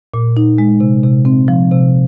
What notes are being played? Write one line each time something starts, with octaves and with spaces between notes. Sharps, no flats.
A#2
D#4
G#3
C3
C3
C4
F3
C3